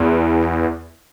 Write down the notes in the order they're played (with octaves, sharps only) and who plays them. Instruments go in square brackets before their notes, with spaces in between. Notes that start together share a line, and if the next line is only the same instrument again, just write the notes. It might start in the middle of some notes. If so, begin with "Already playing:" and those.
Already playing: [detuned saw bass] E2